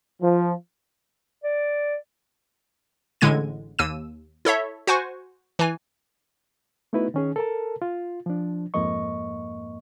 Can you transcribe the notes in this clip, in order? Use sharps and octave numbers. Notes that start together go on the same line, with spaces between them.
F3
D5
A1 A2 D3 G#3 G#6 D#7
D#2 E6 D#7
E4 A4 C#5 E5
F#4 C5 F#5 G#5 C#6
E3 G#5
A3 B3 D#4 E4 F#4 B4
D#3 C#4 G#4
A4 A#4 A5
F4
F3 D4
F2 G#2 A#3 D#5 C#6